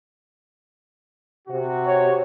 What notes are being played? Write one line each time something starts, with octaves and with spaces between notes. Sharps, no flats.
C3 F#4
C#5